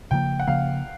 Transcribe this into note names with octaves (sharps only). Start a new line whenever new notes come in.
C#3 F3 A#3 G5
F#5
C#3 F3 A#3 F5